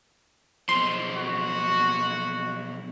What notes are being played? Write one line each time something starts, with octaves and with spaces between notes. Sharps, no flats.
B1 F3 C6
F#4